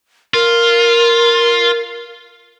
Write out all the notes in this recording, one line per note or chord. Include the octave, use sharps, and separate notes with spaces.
F4 A#4